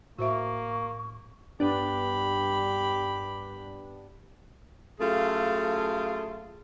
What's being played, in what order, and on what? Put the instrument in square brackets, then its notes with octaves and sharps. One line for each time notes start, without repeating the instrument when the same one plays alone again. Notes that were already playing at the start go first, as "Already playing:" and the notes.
[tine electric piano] A2 [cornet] A#3 [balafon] F#4 C5 E5 [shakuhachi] C#6
[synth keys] G2 B3 D4 [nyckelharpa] G4 B5
[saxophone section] F#2 A3 F4 G#4 A4 F5